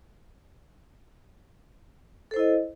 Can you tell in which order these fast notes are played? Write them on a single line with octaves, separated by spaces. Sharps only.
A4 C5 E4 D#5